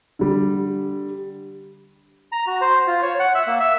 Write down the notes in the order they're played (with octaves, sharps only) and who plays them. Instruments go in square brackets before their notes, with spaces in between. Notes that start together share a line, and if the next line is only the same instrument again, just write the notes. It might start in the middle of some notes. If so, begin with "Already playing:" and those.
[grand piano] D3 G3
[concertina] A#5
F#4
C5
F4
C#5
F#5
E5
A#3
E5